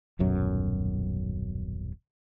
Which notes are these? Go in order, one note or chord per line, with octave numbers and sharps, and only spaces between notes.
D#1 B1 F#2 F#3